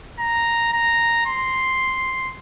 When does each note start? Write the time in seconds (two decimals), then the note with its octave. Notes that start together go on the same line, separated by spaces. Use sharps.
0.19 A#5
0.73 A#5
1.26 C6